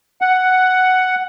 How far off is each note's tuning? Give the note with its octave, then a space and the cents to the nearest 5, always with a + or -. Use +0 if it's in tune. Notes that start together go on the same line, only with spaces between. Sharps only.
F#5 +5